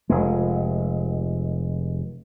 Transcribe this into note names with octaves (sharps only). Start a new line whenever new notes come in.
F1 G#3